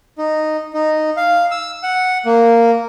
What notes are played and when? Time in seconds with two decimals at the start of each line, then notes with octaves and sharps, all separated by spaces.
0.18 D#4
0.73 D#4
1.17 F5
1.51 E6
1.83 F#5
2.26 A#3